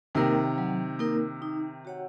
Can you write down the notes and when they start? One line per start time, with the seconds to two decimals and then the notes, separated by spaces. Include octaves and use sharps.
0.15 C3 D#3 A#3 D#4 A#4
0.58 F#3
0.99 A#3 D#4 A#4
1.42 D#4
1.85 F#4 C#5 F#5